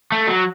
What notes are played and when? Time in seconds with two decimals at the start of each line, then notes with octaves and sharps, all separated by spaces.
0.12 A3
0.27 F#3